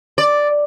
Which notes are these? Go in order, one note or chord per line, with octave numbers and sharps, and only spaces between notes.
D5